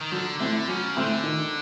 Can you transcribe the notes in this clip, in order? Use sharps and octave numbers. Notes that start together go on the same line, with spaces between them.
D#3
D3 F#3
D3 A3 C4 E4
C#3 F#3
D3 A3 C4 E4
D#3